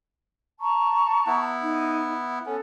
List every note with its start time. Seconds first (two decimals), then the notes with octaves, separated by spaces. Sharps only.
0.60 A5 A#5 C#6
1.27 B3 E4
1.62 D#4
2.46 B3 C#4 A4